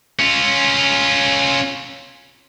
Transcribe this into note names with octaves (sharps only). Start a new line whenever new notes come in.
C#4 F4